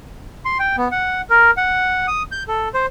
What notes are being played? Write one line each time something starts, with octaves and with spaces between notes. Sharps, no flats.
C6
G5
B3
F#5
A#4
F#5
D#6
G6
A4
C5